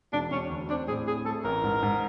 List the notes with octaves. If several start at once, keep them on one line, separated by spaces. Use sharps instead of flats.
E1 D4
E1 C#4
D2
C4 D4
A2 G#4
C4 G#4
A3 A4
A1 A#4
G#2
G#2